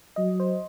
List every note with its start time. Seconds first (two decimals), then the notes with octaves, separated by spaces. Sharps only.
0.16 F#3 D#5
0.40 C5